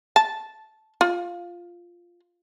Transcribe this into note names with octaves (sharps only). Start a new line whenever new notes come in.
A5
F4